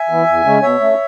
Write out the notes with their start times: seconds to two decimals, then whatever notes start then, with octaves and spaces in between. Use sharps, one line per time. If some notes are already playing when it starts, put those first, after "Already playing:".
Already playing: E5 G#5
0.09 E3 B3
0.27 E2
0.45 C#3 G#3 C#4
0.62 B2 C#5 E5
0.80 A3 C#4